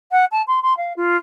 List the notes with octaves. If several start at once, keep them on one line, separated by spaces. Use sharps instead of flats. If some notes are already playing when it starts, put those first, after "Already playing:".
F#5
A5
C6
C6
F5
F4